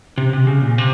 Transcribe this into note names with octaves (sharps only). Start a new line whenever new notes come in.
C3
C3
C#3
A#2
C3